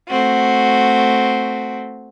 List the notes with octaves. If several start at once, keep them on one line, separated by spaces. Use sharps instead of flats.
A3 C4 F#4